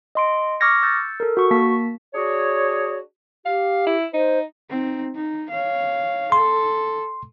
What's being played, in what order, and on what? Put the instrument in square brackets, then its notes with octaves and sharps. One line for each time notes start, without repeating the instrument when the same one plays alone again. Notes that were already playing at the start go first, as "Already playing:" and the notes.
[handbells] D#5 C6 D7
C#6 D6 F6 G#6 A#6 C#7
E6 G6 A6 C#7
A4 A#4
F#4 C#6
A#3 A5 B6
[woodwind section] D4 F#4 G#4 C#5
[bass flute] G4 [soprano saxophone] F5
[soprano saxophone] E4
[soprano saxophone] D#4 [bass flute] C5
[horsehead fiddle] C4 D#4
D#4
C#5 F5
[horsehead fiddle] A4 [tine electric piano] C6